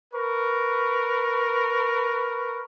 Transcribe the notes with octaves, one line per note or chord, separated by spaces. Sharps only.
A#4 B4 C#6